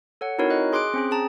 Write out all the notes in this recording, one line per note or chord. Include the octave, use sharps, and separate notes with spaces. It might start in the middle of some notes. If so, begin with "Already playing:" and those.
A4 C#5 F#5
C4 D#4 E4 F#4 A#4 C#5
D#5 F#6
G#4 C6 D6 F#6 D7
C4 C#4 G#4
G#4 A5 A#5